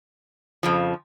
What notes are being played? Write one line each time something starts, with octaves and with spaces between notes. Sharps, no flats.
F2 C#3 F3